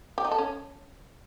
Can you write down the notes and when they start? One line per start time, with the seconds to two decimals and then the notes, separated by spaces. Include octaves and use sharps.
0.18 G4
0.25 D#4
0.32 A4
0.38 C#4